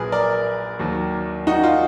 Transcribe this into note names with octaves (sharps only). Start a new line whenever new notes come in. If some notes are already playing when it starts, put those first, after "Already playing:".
Already playing: A#1 A#2 F#3 G#4 A#4 B4
A#4 D5
D#2 D#3 F#3
D#4 F#4
F4